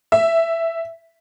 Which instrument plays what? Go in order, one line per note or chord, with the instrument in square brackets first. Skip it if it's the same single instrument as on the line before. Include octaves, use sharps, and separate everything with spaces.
[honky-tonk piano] E5